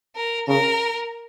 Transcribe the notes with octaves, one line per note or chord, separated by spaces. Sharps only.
A#4
C#3 A#4